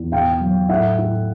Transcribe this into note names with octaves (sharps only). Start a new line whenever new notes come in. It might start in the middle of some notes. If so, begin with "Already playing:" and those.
Already playing: E2
B2 F5 G5
F#3
A2 E5 F#5
A2